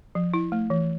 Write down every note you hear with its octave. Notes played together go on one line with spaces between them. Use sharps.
F3
E4
A3
E3